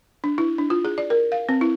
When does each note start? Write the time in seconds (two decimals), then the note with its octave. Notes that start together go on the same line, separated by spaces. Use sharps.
0.24 D4
0.38 E4
0.58 D4
0.70 F4
0.85 G#4
0.98 D5
1.10 A#4
1.32 F5
1.49 C4
1.61 E4